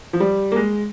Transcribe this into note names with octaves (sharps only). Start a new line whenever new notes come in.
F3
G3
A#3
G#3